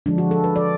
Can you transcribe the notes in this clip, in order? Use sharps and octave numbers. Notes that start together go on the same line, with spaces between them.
D3 F3 G#3 D4
F#4
A4
B4
D5